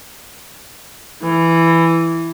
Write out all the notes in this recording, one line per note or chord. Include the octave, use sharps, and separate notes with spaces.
E3